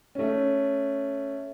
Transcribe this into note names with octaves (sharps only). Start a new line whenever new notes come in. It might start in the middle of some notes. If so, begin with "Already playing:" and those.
A3 C#4